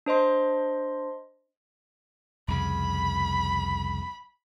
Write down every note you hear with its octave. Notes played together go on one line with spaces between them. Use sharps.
D4 C5 D#5 C6
C2 F2 C#3 B5